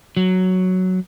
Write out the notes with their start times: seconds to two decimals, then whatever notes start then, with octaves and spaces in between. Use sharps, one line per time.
0.17 F#3